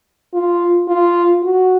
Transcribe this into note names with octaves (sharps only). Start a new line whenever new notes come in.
F4
F4
F#4